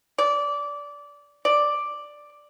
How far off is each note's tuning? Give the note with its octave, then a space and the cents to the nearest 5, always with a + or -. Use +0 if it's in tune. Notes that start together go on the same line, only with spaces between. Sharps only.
D5 -20
D5 +5